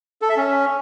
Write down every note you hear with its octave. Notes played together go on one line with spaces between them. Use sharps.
A4
E5
C#4